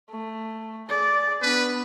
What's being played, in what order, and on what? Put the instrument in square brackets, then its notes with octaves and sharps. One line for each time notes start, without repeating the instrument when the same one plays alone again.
[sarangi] A3
[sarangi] G#4 [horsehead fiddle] D5
[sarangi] B3 [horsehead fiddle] D4 [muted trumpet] B4